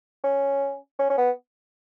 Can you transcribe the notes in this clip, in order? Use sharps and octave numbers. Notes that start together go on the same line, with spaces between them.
C#4
C#4
C#4
B3